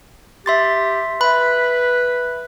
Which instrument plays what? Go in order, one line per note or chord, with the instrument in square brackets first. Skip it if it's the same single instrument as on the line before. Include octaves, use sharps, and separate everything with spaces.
[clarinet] G4 [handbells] E5 C6 A6
[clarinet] B4 [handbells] E5 B5